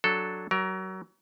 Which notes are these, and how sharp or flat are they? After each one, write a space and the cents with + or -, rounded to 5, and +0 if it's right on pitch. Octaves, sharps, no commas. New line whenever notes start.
F#3 +0 D4 +0 A4 +0
F#3 +30 A#4 +10